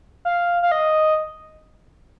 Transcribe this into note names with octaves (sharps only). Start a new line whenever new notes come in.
F5
F5
D#5